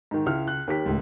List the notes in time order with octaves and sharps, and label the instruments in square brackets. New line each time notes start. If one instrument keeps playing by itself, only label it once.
[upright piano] G#2 D#3
[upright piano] C#2 F6 [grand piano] E4
[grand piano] F#6
[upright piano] D#2 G4 B6
[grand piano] C#2 A2